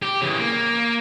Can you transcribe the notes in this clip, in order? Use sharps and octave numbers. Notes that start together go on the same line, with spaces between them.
G4
C#3 E3
A#3